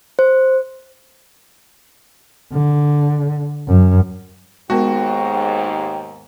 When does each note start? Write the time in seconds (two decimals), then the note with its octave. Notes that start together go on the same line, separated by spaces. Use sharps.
0.19 C5
2.53 D3
3.67 F#2
4.70 D#2 G#2 G#3 B3 F#4 A#4 G5